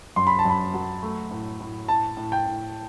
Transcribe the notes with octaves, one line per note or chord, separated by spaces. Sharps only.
F#2 C6
B5
A5
F#2 B5
F#3
A3
A2
A2
A2 A5
A2
G5
A2